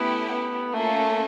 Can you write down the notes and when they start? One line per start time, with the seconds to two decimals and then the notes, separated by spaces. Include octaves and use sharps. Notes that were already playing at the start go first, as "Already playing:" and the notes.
Already playing: A3 B3 C#4 E4 G4
0.31 B3
0.74 A3 A#3 C#4 F4 A4